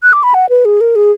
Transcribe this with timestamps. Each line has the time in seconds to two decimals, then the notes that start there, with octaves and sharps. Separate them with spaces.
0.03 F#6
0.13 D6
0.23 B5
0.34 F#5
0.49 B4
0.65 G#4
0.81 A#4
0.96 G#4